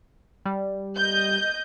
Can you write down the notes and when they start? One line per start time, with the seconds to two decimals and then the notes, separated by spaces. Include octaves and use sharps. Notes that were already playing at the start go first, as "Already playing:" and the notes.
0.45 G3
0.97 D#5 G6